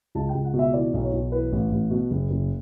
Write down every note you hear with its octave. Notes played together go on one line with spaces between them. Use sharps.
C#2 A5
G5
C#2
F#5
B2
E5
E3 D5
B1
C#5
B1
E3 B4
A1
A1
B2
F#1
F#1